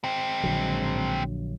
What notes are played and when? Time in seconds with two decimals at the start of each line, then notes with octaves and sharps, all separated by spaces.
0.04 G#3 C4
0.43 A#1 D3 F#3